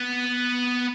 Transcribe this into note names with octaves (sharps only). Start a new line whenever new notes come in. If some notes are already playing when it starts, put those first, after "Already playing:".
Already playing: B3